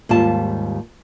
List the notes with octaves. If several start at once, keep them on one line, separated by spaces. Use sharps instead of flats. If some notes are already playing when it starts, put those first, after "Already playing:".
D#2 G#2 G3 F4 A5